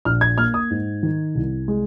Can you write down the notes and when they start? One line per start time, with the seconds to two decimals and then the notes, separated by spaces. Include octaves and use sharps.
0.05 A#1 F6
0.21 G#6
0.38 A#3 F6
0.54 D#6
0.70 G#2
1.03 D#3
1.35 C2
1.68 G#3